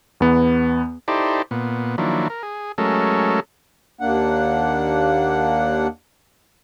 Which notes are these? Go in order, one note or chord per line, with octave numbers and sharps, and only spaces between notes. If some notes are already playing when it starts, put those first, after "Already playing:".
E2 B3
D#4 E4 G4 A4 C5 D5
A#2 B3
D#3 F3 F#3 A#3 D4 E4
A#4
G#4
F#3 G#3 A3 C#4 A4 A#4
D#2 A#3 D4 F#5